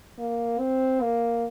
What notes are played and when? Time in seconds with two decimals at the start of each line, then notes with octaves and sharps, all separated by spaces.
0.19 A#3
0.59 C4
1.02 A#3